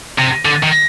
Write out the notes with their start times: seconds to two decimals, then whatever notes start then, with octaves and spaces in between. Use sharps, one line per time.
0.18 C3
0.45 D3
0.63 D#3